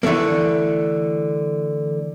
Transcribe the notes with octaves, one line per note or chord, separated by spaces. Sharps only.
D3 E3 F3 A3 A#3